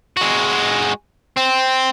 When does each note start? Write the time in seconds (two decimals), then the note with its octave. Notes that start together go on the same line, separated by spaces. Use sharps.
0.17 G#3 F#4
1.37 C4